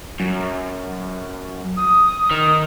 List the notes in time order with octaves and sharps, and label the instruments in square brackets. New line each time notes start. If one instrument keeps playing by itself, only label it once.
[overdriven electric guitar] F#2
[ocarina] D#6
[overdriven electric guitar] D#3